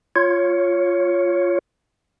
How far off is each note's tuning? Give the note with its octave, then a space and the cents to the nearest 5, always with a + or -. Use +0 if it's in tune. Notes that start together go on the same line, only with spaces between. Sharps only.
F4 +0 C#5 +0